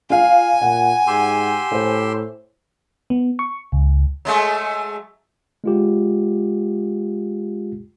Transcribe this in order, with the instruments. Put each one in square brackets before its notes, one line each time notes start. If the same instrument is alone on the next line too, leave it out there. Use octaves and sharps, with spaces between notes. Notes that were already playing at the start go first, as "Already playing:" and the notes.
[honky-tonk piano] F4 F5 [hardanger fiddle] G#5
[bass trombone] A#2 [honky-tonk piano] F#5
[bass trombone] G#2 [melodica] G4 C6 E6
[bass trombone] A2 [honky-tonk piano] C5
[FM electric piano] B3
C#6
C#2
[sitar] F#3 G#3 A3
[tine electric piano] G#3 F4 G4